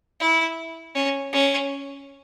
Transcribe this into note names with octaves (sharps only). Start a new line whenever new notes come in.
E4
C#4
C#4